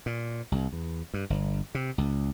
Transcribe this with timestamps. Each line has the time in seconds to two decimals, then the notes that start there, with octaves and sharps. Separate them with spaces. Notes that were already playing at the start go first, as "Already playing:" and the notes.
0.06 A#2
0.52 C2
0.73 E2
1.14 G2
1.30 G1
1.75 C3
1.98 C#2